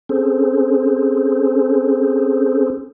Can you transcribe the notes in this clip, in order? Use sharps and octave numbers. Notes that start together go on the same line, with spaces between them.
C4 C#4 G#4 A4 C5